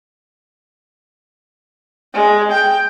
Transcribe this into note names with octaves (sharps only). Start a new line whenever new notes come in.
G#3
G5